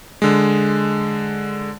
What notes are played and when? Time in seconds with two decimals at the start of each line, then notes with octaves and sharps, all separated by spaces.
0.22 D3 G#3